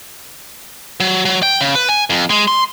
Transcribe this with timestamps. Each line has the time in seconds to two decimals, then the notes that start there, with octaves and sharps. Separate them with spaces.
1.00 F#3
1.25 F#3
1.43 G5
1.61 C#3
1.75 B4
1.89 G#5
2.10 F2
2.30 G#3
2.48 C6